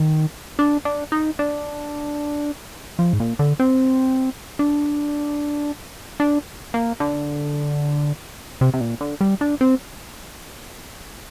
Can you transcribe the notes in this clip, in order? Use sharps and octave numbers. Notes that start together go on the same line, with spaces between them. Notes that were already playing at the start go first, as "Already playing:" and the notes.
Already playing: D#3
D4
D4
D#4
D4
F3
G#2
A#2
D3
C4
D4
D4
A#3
D3
C3
C3
A#2
D3
G3
D4
C4